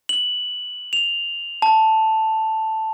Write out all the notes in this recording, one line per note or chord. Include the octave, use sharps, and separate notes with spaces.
F#7
F7
A5